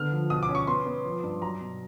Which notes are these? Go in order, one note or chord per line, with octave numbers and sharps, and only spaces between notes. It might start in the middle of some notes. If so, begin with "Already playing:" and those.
Already playing: D3 B3 F6
F3
B2 D#6
D6
C#4
C#6
B3 C6
B3
F3
G2
F#3 A#5
B2